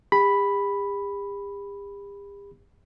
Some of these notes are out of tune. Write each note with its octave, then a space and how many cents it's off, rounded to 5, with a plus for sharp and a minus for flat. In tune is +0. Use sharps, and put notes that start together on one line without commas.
G4 +45 B5 +0